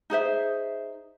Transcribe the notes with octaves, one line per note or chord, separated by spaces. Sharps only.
D#4 G#4 C5 E5